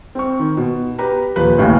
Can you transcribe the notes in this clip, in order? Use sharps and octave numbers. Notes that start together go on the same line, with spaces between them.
C4 C#6
D#3
B2
G4 B4 A#5
D#1 F3 B4
A1 D#2 A2 C#3 E3